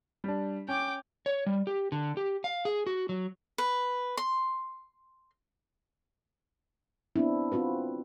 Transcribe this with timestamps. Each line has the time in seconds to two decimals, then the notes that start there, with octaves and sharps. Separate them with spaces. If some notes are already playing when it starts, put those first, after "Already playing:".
0.24 G3 D4
0.68 C#4 G5 D6
1.26 C#5
1.46 G3
1.67 G4
1.92 D3
2.17 G4
2.44 F5
2.65 G#4
2.87 F#4
3.09 F#3
3.58 B4
4.17 C6
7.16 B3 C4 D4 E4
7.52 C4 F4 F#4 B4